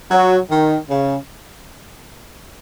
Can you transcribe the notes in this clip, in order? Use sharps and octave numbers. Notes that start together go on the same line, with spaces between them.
F#3
D#3
C#3